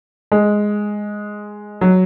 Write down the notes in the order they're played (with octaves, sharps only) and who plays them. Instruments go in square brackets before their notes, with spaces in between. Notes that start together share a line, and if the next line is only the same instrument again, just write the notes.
[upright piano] G#3
F#3